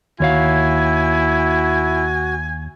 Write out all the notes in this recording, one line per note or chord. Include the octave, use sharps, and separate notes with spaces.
D#2 E4 F#4 C#5 F5 G#5